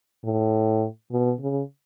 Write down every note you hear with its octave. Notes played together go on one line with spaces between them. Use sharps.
A2
B2
C#3